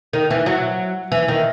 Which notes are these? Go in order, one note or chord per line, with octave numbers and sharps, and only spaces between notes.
D#3
E3
F#3
E3
D#3